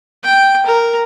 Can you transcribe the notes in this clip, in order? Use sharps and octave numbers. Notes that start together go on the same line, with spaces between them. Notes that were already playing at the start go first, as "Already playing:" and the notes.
G5
A#4